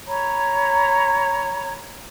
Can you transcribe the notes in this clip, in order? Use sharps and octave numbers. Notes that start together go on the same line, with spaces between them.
C#5 A#5 B5